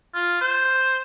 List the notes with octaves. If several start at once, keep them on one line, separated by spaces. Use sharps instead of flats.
F4
C5